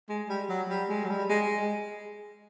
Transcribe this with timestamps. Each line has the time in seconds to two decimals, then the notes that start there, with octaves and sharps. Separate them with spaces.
0.09 G#3
0.29 G3
0.49 F#3
0.69 G3
0.89 G#3
1.05 F#3
1.10 G3
1.29 G#3